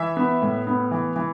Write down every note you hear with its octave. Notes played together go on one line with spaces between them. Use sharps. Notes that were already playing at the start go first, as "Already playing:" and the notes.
Already playing: E3 E5
B3
A2
B3
E3
E3